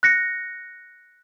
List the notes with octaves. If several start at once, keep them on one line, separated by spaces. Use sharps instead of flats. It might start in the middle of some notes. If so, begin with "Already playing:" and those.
F#6 A#6 C#7